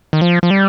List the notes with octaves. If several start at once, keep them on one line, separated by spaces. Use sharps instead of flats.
D#3
F3
F3
G3